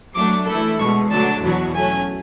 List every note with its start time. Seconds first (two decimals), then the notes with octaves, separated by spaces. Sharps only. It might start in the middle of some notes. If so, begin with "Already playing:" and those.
0.15 F#3 A3 D4 D6
0.47 E3 A3 E4 A4
0.79 E2 B2 G#3 C#6
1.11 D3 F#3 A3 D4 A5
1.43 E2 B2 F#3 B3 F#4
1.75 F#3 A3 C#4 G#5